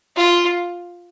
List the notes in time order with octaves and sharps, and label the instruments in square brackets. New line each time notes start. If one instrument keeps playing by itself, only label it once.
[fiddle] F4